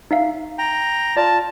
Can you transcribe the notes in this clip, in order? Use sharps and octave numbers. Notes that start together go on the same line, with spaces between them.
D#4 E5 F5
G5 A#5
F4 D5 A5